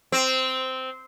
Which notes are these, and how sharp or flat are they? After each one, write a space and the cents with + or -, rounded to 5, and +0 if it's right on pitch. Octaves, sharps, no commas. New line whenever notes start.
C4 -10